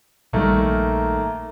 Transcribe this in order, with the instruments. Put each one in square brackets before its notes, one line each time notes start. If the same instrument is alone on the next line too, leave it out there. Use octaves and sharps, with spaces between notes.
[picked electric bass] A#1 G3 [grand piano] D#3 A3 A#3